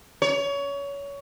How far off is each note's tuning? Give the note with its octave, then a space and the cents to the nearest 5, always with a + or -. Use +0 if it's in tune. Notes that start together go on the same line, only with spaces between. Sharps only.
C#5 +25